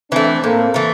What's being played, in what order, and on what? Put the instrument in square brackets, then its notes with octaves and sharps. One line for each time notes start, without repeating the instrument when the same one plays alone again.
[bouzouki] E3 A3 [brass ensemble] C4 D4
[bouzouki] A2 [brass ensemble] A#3 C4
[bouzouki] E3 A3